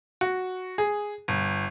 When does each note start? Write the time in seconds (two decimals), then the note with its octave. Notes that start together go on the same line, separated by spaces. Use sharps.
0.21 F#4
0.78 G#4
1.28 G1